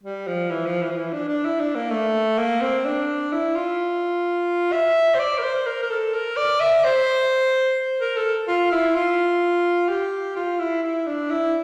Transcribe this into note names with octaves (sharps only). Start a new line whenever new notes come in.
G3
F3
E3
F3
E3
F3
E3
D4
D4
E4
D4
A#3
A3
A#3
C4
D4
E4
F4
E5
C5
D5
A#4
C5
A#4
A#4
A4
A#4
D5
E5
C5
A#4
A4
F4
E4
F4
G4
F4
E4
E4
D4
E4